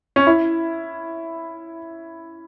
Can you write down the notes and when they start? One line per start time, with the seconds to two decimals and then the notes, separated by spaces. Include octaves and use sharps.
0.16 C#4
0.27 E4